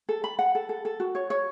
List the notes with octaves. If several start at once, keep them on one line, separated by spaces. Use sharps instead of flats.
A4
B5
F#5
A4
A4
A4
F#4
C#5
C#5